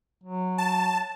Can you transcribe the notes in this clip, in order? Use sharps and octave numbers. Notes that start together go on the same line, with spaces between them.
F#3
A5